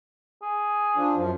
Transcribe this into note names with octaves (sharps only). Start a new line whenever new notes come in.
G#4
F3 D4
F#2 F3